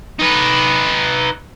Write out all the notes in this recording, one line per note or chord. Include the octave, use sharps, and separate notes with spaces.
D#4 B4